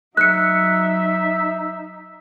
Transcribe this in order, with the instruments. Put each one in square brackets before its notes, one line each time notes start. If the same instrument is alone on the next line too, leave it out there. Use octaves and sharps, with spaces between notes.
[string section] F#3 [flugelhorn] D#4 [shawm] E5 [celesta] F#6 C#7